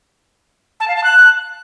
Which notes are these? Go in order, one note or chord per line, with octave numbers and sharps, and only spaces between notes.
A5
F5
A5
F#6